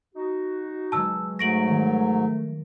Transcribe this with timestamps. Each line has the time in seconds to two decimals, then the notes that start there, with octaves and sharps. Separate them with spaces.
0.15 D#4 F#4
0.92 B2 F#3 G#3 A5 E6
1.39 G#2 F#3 A3 C#6 A#6 D7 F#7
1.68 D#3 F3